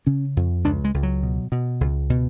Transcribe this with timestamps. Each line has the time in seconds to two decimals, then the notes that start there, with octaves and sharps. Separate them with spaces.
0.07 C#3 C#4
0.37 F2
0.64 C#2 D4
0.85 G#3
0.94 C#2
1.03 F#3
1.23 B2
1.52 B2
1.81 C#2
2.10 B2